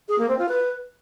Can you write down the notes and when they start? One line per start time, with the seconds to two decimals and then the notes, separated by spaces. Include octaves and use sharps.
0.08 G#4
0.18 A#3
0.28 C4
0.38 F4
0.48 B4